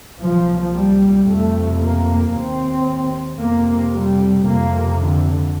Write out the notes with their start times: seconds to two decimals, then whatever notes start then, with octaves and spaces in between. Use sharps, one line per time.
0.21 C2 A#2 F3
0.75 G3
1.27 F2 C3 A3
1.81 A#3
2.34 D#2 C4
3.40 F2 C3 A#3
3.93 G3
4.46 F2 C3 A#3
5.00 D3